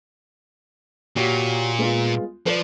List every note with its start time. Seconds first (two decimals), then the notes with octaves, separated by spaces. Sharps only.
1.16 A#2 F#4 G4 C#5
1.79 G#3 B3 F4
2.46 F3 B4 D5